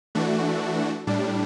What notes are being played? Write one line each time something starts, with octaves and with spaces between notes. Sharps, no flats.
E3 A3 D4 F#4
A2 G3 D4